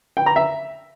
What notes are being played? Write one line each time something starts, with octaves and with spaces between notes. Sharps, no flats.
G5
A#5
E5